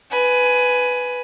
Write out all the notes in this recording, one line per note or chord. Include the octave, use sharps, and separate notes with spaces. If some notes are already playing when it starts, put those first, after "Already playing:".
B4 G#5